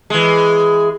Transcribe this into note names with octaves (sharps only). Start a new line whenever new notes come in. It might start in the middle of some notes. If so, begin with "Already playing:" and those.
E3 G#3